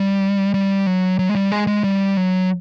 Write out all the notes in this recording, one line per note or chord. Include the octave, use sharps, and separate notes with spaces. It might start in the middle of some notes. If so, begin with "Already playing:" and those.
Already playing: G3
G3
F#3
F#3
G#3
G3
G#3
G#3
G3
F#3